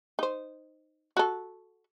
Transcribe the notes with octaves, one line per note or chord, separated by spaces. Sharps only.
D#4 C5
F#4 A4